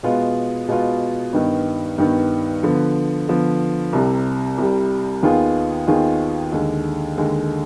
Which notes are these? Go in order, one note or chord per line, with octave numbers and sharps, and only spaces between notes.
B2 G#3 B3 F4
B2 G#3 B3 F4
G2 D#3 B3
G2 D#3 B3
D3 F3 B3
D3 F3 B3
C2 C3 G3
C2 C3 G3
D#2 D#3 B3 F4 G#4
D#2 D#3 B3 F4 G#4
D#2 D3 G#3
D#2 D3 G#3